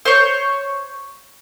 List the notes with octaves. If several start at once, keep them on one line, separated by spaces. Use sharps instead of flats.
C5 C#5